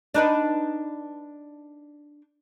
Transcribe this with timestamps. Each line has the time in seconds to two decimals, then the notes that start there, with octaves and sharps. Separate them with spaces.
0.14 D4 D#4 B4